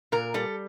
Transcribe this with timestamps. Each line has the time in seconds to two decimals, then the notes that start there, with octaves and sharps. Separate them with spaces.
0.12 A#2 A#4
0.34 G3 A4